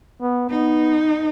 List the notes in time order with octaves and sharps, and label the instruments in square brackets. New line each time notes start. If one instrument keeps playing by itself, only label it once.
[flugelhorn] B3
[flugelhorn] B3 [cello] D#4